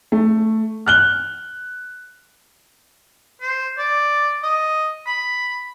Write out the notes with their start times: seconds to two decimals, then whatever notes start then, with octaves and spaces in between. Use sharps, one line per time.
0.12 A3
0.86 F6 F#6 G7
3.41 C5
3.78 D5
4.43 D#5
5.07 B5